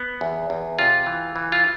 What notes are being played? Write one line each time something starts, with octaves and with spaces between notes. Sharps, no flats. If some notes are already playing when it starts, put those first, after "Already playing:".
Already playing: B3
E2
E2
C3 F4
E3
E3
F4